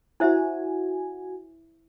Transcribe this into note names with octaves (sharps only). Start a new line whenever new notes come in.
E4 F#4 C5 E5 G#5